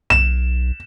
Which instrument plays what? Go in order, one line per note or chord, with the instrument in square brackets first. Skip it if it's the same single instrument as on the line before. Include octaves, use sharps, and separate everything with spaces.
[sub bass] B1 [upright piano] E7